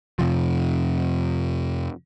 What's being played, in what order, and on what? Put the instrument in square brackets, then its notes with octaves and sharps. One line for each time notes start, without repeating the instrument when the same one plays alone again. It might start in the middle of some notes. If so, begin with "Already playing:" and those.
[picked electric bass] F2 C3 F3